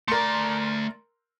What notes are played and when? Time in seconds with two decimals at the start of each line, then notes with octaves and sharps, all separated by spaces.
0.08 A3 A#4 D5 C6